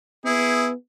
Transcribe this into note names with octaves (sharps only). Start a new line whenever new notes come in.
B3 E4 G#4